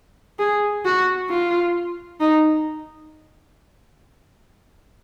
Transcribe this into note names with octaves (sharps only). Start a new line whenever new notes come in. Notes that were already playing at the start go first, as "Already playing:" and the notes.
G#4
F#4
F4
D#4